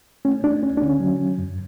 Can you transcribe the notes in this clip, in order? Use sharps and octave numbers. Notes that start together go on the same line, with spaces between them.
A3 C#4
A3 D4
D2 C#4
D4
D3 C#4
F#3
F#3
F#2